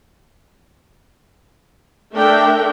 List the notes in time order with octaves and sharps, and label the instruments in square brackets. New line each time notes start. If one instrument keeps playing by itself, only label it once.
[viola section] A3 D4 A#4 E5 G5